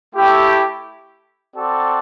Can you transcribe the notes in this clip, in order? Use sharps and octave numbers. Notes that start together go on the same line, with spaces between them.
A3 E4 G4
C4 F#4 A4 D5